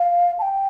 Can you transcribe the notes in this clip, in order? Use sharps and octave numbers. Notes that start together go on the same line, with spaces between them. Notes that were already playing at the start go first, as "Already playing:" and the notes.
Already playing: F5
A5
G5